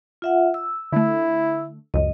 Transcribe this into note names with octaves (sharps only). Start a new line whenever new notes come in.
F4 E5 F#5
E6
D3 A3 E4
C#2 F#2 D#5